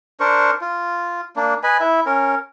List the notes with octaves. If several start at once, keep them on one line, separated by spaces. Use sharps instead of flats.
D4 A#4 C5 C#6
F4
A#3 D4
B4 D#5 G#5 B5
E4 E5
C#4 A#4